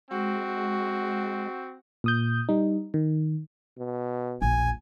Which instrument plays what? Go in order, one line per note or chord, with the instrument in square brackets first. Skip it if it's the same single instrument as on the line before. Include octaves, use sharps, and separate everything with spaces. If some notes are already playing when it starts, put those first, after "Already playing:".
[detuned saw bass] G#3 [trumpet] C4 [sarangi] F#4
[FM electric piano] A#2 D#6 G6
G3 D#4
D#3
[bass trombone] B2
[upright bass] E1 A#1 [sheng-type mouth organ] G#5